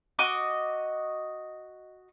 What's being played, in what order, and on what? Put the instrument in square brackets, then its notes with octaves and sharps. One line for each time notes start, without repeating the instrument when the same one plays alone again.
[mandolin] F#4 D#5 D6